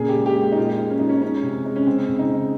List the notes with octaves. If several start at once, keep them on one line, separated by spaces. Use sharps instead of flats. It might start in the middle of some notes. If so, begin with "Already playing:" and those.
Already playing: A#2 C#3 G#4
G4
G#3
G4
G#3
G4
D#4
A#2 F4
G#3
C#4
F3 D#4
C#4
G#3 C#4
C3
G#3
C#4
C#3 C4
C#3
D#4
C#3